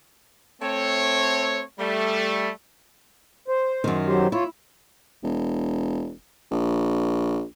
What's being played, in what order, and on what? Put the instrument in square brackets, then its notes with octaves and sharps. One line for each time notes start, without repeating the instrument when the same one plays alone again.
[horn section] A3 C4 C#5
G3 A3
[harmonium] C5
[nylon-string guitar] F#2 D#3
[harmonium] F#3 G4 C5
[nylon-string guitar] E4 [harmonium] F4 C#5
[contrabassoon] E1
A#1